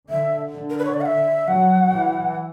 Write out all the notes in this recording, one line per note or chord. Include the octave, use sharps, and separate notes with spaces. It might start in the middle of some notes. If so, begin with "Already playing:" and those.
D3 E5
D3
A#4
B4
C#5
D5
F#5
E5
F#3 F#5
E3